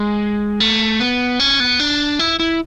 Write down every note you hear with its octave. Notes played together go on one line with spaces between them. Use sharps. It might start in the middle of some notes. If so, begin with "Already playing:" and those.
Already playing: G#3
A3
B3
C#4
B3
D4
E4
E4